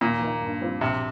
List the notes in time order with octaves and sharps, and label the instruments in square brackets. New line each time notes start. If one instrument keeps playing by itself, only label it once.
[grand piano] D#2 [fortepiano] A#2
[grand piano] D#3 A#3 D#4
G2
G3 C4 F4
[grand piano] A#1 [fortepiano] C3